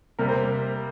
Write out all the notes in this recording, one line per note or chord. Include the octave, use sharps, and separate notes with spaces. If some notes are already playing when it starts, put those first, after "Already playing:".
C3 G3 A#3 A#4
C5